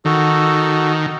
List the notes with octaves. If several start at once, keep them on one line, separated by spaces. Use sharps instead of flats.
D#3 F#4 A4